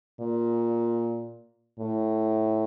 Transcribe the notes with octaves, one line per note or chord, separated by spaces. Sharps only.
A#2
A2